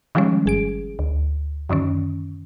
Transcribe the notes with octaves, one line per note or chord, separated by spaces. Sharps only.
D#3 F3 G3 G#3 C#4
G1 G#4 D7
D2
F#2 D3 D#3 C#4